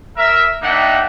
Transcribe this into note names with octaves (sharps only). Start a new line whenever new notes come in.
A#4 E5
A#3 D4 D#4 E5 F#5 G5